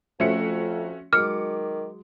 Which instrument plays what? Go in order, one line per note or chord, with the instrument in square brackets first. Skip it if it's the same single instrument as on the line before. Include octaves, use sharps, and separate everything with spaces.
[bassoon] F2 [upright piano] F3 A3 C#7 [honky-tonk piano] C#4 F#4 E5
[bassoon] D#3 [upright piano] F#3 G#3 [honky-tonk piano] D6 C#7 [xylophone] F6